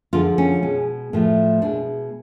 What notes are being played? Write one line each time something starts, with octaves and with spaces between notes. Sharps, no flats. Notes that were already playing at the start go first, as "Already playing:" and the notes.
F2 D3 F3 G#3 F4
C#4
B2 G#3
A2 F3 A3
B2 G#3 D4